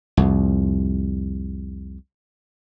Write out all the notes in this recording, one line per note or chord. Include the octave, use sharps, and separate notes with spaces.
C2 F2